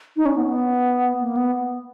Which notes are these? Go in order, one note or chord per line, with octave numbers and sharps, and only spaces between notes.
D#4
C#4
B3
B3
A#3
B3